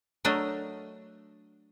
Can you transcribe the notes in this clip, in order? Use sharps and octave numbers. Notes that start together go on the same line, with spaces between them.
F#3 A3 D4 A#4 D#5